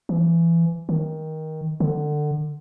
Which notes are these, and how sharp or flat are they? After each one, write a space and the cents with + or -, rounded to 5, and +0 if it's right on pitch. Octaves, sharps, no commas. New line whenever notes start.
E3 +25
D#3 +15
D3 +25